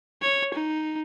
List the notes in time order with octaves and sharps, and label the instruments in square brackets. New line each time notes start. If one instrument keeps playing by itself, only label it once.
[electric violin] C#5
D#4